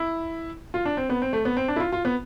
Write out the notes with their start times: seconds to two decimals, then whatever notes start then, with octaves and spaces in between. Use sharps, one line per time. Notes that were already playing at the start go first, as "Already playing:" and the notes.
Already playing: E4
0.74 F4
0.85 D4
0.97 C4
1.10 B3
1.22 C4
1.33 A3
1.45 B3
1.57 C4
1.68 D4
1.76 E4
1.80 F4
1.92 F4
2.05 B3